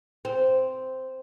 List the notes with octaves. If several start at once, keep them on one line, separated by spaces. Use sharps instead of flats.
C4